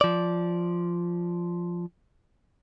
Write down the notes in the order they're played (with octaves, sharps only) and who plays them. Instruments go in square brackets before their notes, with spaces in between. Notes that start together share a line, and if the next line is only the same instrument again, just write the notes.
[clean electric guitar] F3 D5